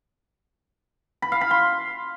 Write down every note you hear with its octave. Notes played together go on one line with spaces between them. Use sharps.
B5
F5
B5
C6